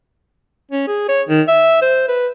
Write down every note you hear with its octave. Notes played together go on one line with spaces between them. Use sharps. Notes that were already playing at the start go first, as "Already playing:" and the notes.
C#4
G#4
C#5
D#3
E5
C5
B4